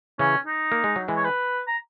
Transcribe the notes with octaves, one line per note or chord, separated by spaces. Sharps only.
C#3 E3 C#4
D#4
A#3
G#3
F#3
E3 G#3
C#5
B4
A#5